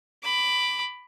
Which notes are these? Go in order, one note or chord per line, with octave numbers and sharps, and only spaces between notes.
B5 D6